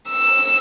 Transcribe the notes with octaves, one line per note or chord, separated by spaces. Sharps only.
E6